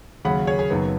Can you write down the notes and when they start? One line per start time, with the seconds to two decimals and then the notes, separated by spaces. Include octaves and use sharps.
0.25 D#2 C#3 F#3 F#5 B5
0.47 G#4 C#5
0.59 G#4
0.70 F#1 F#2 D#3 F#3 B3